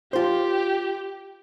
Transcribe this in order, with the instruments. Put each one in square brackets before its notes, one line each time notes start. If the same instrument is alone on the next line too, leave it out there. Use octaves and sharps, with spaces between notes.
[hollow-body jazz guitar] F4 C5 [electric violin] G4